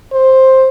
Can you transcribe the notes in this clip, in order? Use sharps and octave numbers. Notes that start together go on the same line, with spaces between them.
C5